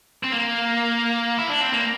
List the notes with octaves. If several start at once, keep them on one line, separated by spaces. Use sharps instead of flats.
C4
A#3
E4
D4
C4
A#3